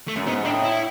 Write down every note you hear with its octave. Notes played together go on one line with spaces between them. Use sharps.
A3
F#2
G#2 B3
A2 D4
E4